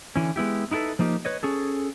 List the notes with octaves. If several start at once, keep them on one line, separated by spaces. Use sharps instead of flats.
D3 E3 C#4
G#3 B3 E4 G4
D#4 E4 F#4 A4 B4
F3 A#3 D#4 G4
B4 C#5 D#5
C#4 G#4 A4